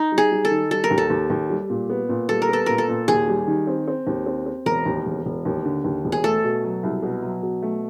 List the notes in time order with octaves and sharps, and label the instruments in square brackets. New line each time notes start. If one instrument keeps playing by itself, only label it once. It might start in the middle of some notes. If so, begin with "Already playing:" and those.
Already playing: [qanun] D#4
[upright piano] G3
[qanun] G#4
[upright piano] G3
[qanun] A4
[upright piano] D#3
[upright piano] G3 [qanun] A4
[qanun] A#4
[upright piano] D#2
[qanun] A4
[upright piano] D#2
D#2
G3
A#2
B3
A#2
[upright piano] G3 [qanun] A4
[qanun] A#4
[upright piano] B3 [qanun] A4
[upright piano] A#2 [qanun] A#4
[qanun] A4
[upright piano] A#2
[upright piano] D#2 [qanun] G#4
[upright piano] G3
D#3
C4
C4
D#2
C4
C4
[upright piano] E1 [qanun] A#4
[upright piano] D#2
E1
E1
D#2
D3
D#2
E1
[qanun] G#4
[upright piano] A3 [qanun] A4
[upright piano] B2
F#3
C2
B2
F#3
B2
A3